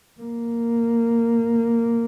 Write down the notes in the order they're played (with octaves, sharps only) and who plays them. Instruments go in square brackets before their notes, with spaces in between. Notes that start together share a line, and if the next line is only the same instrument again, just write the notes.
[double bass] A#3